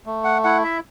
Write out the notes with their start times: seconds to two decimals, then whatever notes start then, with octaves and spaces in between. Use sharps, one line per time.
0.06 A3
0.24 F#5
0.44 E4 F#5
0.64 E5